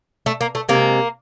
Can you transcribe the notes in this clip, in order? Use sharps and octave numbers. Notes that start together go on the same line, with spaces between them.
A3
A#3
A3
C3 D#3 G#3 A#3